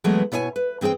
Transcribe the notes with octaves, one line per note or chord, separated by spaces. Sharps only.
E3 F#3 G#3 A3 B3
B2 E4 C#5 D5 G#5
B4
E3 C4 G#4 C5 G5